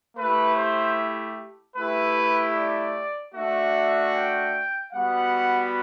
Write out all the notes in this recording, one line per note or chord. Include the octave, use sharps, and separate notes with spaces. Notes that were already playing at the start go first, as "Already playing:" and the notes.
A3 E4 G4 B4
C5
A3 E4 G4 B4
D5
A3 D4 F#4 E5
G5
G3 B3 F#4 F#5